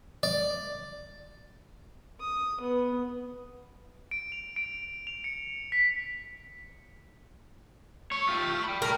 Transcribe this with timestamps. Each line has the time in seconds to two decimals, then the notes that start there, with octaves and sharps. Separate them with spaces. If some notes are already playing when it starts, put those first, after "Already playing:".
0.23 D5
2.20 D#6
2.61 B3
4.11 D7
4.32 F7
4.56 D7
5.07 F7
5.24 C#7
5.72 B6
8.12 A3 C#5
8.29 F4 G4
8.64 G5 B5
8.82 A2 A#4